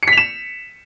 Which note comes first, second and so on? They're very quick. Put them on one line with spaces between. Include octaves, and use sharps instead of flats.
C#7 B6 F7 E7